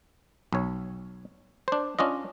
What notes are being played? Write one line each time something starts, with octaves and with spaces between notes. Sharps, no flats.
B1 C#5
D4 C5
C#4 D4 F4 D#5